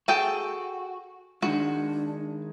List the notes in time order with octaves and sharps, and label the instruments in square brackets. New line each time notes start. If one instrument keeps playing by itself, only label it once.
[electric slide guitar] F#4 [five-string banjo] G#4 A4 G5
[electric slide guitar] D#3 G#3 [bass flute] D4 [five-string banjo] F#4